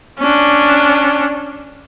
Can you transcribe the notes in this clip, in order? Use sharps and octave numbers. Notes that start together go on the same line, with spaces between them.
C#4 D4